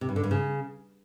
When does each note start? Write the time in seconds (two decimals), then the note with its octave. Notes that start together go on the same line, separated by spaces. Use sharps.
0.01 C3
0.09 G2
0.16 D3
0.23 G2
0.31 C#3